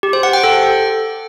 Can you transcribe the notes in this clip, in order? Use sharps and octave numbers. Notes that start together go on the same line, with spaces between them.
G4
C5
F#5
G5
A4